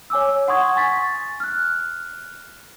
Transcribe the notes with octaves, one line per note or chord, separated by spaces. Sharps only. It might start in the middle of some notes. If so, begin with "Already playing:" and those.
C#5 G#5 D6 E6
F#5 C6 C#6 D#6 G#6
G#5 C#6 A6 B6
F6 F#6